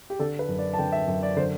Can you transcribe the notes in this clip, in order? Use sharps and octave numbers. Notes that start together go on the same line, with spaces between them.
G4
D3 A4
B4
F#2
D5
A5
D3 G5
E5
F#2
D5
D3 C5